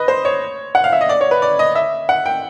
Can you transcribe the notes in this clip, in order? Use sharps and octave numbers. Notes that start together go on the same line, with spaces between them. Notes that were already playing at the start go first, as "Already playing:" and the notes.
Already playing: B4 D#5
C5
C#5
F#5
F5
E5
D#5
D5
C#5
B4
D5
D#5
E5
F#5
G5